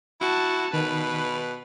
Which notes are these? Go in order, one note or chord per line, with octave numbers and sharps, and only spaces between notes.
E4 F#4 A5
B2 D#3 B4